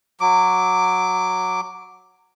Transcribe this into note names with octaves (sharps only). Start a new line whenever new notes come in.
F#3 D6